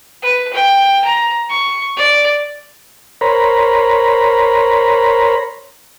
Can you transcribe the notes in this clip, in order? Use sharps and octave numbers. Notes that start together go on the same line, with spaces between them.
B4
G5
A#5
C#6
D5
A#4 C5 C#5 A#5 B5